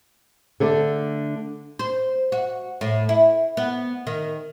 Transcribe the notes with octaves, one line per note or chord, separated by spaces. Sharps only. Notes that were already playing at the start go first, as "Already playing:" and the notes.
D3 A3 D4
C5
F#4
A2
E4
B3
D#3